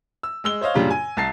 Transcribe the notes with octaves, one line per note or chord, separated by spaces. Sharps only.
E6
G#3 E6 G7
C5 C#5 D#5 F5
F#2 A#2 C#3 G3 D4 F4
G#5
C2 A5 A6 C7